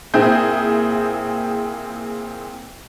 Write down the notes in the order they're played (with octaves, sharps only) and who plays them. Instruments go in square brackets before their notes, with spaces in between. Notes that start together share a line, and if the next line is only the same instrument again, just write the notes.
[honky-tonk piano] A#2 C4 E4 G#4 G6